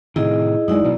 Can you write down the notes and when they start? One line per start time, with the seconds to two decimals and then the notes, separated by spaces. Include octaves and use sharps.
0.16 A2 C3 D#3 E4 G#4 D#5
0.68 F#2 G#3 D#4 E4 D5
0.84 B2 F#3